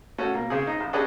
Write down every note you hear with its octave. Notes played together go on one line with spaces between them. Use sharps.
A3 C#4 F#4 F#5
B2 A#3
C#3 C4 G#4
D#4
A1
C#4 D4 G4 G#4 B4 D#5